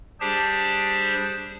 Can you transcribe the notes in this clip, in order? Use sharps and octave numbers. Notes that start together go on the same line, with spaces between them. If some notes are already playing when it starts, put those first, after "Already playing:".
G3 D4 G4 G#4 C5 A5